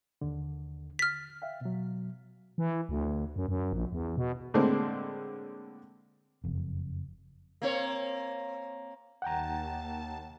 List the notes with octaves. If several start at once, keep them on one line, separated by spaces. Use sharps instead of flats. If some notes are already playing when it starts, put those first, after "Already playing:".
D#2 D3
F6 A6 B6
E5 F5 G5
B2 F#3
E3
D2
F#2
F#2
A#1
E2
B2
A2 D3 G#3 A#3 C4
F#1 F2
A#3 C4 C#5
D#2 F#5 G5 A5 A#5